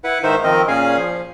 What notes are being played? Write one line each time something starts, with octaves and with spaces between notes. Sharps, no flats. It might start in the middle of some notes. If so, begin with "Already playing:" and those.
E4 B4 F#5
G#2 D#3 D#4 C5 E5
D#3 F3 C4 A#4 D#5
A#2 C#4 G#4 F5 G#5
F3